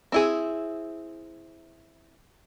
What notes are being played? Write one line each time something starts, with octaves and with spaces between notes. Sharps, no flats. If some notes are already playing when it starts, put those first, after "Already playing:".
C4 E4 G#4